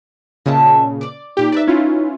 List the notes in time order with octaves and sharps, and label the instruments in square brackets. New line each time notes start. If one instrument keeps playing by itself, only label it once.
[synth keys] A#2 C#3 [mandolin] D#5 E5 A5
[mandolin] D5 D6
[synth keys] A#2 G4 [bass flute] D#4
[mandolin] B4 C5 [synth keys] D5 E5
[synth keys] C#4 E4 F4